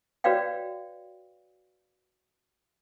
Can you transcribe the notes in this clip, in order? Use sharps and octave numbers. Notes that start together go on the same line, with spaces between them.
F#4 B4 C#5 D5 F5 G5